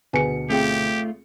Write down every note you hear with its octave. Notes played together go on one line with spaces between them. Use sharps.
D2 B2 G#4 B4 G#5 C#7
A3 C4 F4 G4 G#4 G5